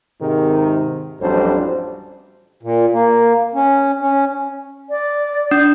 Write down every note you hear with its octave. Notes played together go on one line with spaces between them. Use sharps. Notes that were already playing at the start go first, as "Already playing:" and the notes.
G#2 C3 D#3
A1 F2 F#3 G3 D4 C5
A#2
A#3
C#4
C#4
D5
D4 G6